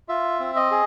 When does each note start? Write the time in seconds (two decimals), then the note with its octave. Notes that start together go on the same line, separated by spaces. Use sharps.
0.09 F4 E5
0.39 C4
0.56 D#5
0.71 G#4